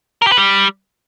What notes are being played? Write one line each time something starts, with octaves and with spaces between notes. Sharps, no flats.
A#4
G4
B4
G3